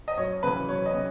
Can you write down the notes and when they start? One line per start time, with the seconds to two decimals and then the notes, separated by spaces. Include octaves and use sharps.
0.08 D#5
0.17 F#2 C#5
0.43 C#3 E3 B4
0.69 F#2 C#5
0.86 D#5
0.94 C#3